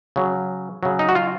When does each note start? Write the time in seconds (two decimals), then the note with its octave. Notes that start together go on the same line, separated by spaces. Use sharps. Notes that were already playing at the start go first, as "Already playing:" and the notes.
0.16 C#3 F#3
0.83 C#3 F#3
0.99 D#4
1.09 F#4
1.15 F4